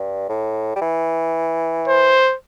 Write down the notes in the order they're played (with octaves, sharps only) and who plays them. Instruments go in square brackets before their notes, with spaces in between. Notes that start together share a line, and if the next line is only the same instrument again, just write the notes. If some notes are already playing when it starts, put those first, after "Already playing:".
Already playing: [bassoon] G2
A2
G3
E3
[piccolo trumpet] C5